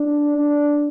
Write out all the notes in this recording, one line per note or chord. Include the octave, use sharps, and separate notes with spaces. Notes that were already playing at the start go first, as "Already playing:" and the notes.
Already playing: D4
D4